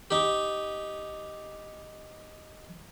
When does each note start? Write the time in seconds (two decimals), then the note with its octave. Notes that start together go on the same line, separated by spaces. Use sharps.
0.11 D#4 G4